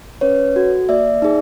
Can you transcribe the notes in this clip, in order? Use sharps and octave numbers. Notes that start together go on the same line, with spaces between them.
C#4 B4 C#5
F#4 A4
A#3 D5 E5
D#4 G#4